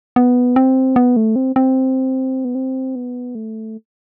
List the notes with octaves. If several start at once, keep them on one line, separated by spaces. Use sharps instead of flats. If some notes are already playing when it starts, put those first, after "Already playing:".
B3
C4
B3
A3
C4
C4
B3
C4
B3
A3